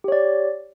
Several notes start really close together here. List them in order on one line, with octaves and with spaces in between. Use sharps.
G4 C#5 D5